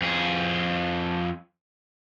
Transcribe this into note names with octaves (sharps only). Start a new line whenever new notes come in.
F2 G#4